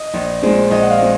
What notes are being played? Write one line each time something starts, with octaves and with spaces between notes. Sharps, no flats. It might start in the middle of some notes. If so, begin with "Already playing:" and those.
Already playing: D#5
A#1
A#2 G#3 C4
A#1 D#5
F#5
F5
A#2 G#3 C4